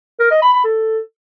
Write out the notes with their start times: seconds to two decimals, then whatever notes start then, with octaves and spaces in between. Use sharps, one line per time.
0.20 A#4
0.31 D#5
0.42 B5
0.53 B5
0.64 A4